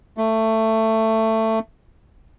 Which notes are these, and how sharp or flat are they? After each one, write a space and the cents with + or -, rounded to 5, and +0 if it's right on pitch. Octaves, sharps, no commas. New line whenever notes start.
A3 +15